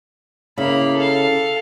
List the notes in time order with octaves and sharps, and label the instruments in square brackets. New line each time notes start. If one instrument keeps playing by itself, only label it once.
[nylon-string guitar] C#3 E4 [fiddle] A#3 B5
[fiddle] A4 F5